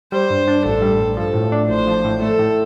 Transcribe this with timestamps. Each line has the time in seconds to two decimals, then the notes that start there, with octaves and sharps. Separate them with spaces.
0.12 G3 C5
0.30 G2
0.48 D4
0.65 A1 A4
0.82 G3
1.00 G2
1.17 F3 A4
1.34 A2
1.52 D4
1.70 A1 C5
1.87 F3
2.04 A2
2.22 A3 A4
2.39 A2